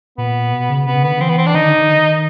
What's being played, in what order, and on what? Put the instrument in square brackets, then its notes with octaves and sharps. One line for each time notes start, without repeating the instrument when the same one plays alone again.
[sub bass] A#2 [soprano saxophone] B3
[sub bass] B2
C#3
[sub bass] C3 [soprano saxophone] B3
[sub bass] C#3
[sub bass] D3 [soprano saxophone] B3
[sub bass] E3 [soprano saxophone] C4
[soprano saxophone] B3
C4
D4
[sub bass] D#3 [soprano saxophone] D#4
[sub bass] D3
D3
D#3